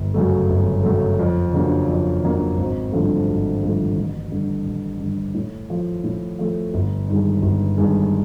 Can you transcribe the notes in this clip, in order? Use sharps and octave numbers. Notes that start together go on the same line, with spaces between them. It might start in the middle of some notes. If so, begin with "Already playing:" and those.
Already playing: G1
F#2 C#3 F#3 A3
G1
F#2 C#3 F#3 A3
F2
C#3 F#3 A#3 D4
F2
C#3 F#3 A#3 D4
G#1
G2 D3 F3 A3
G#1
G2 D3 F3 A3
A1
G2 D3
A1
G2 D3
A2
F3 A3
A2
F3 A3
G1
G2 D#3 G#3
G1
G2 D#3 G#3